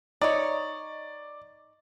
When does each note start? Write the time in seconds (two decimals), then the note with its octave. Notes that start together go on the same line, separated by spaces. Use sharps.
0.21 D#4 C#5 D5